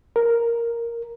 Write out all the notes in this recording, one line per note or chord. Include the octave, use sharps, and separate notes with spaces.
A#4